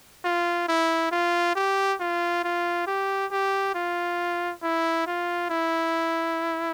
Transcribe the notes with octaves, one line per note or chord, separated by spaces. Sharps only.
F4
E4
F4
G4
F4
F4
G4
G4
F4
E4
F4
E4